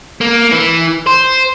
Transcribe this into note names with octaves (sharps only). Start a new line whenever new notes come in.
A#3
E3
C5